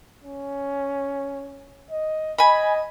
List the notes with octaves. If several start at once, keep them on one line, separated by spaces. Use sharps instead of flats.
C#4
D#5
D#5 G#5 B5